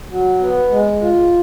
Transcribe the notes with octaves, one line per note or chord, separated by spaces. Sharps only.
F#3
B3
G#3
F4